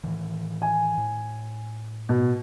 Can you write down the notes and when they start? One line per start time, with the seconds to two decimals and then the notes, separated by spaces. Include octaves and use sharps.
0.04 A2 D#3 E3
0.62 G#5
0.98 A2
2.09 B2